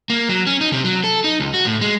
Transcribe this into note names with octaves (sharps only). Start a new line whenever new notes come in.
A#3
F#3
C#4
D#4
C3
F#3
A4
D#4
C#2
F#4
A2
G#3